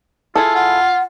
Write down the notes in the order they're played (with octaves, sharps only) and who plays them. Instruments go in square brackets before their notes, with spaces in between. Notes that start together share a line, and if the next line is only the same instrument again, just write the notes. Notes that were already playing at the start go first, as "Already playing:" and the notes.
[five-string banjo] E4 G#4 A4 [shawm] F4
[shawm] F4 [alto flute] F#5